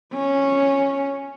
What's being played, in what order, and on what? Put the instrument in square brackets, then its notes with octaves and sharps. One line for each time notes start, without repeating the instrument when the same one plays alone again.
[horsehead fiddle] C#4